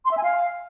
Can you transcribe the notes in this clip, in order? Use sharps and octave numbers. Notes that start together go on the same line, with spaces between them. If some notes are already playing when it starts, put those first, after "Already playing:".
C6
E5
G#5
F5